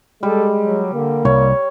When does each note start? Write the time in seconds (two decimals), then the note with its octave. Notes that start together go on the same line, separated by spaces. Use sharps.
0.23 G3 G#3 A4
0.60 F#3
0.94 D3 A#3
1.25 C2 G3 C#5